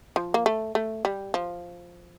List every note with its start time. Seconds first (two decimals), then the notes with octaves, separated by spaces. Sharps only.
0.16 F3
0.34 A#3
0.46 A3
0.75 A3
1.05 G3
1.34 F3